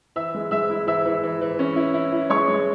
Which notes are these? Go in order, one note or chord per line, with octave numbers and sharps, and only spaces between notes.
E3 E5 E6
G#3
G#3 E5 E6
E4
E3 E5 E6
E3
E3
E3
C#4
E4
E4
E4
G#3 C#5 C#6
G#3